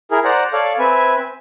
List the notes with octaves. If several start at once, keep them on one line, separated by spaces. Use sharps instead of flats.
E4 G#4 A#4
C5 D5 F#5 A#5
A4 C#5 D5 F5
C4 B4 E5 G#5